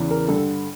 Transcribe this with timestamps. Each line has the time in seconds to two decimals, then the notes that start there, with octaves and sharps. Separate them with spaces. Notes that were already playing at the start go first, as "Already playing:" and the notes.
Already playing: E2 C#3 E3
0.10 A#4
0.27 G2 D3 A4